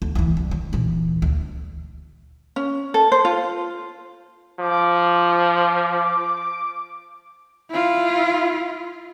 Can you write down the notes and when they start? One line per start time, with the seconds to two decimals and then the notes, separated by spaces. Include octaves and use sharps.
0.02 D2
0.15 D2 E3
0.37 C2
0.51 D#3
0.73 D#1 E3
1.22 D2
2.56 C#4
2.94 A4
3.12 C5
3.25 F4
4.60 F3 D6
7.71 E4 F4